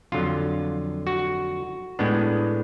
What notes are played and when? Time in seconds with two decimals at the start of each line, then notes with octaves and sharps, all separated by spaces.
0.12 F2 D3 F#3 F4
1.07 F#4
1.99 A2 G#3 B3 D4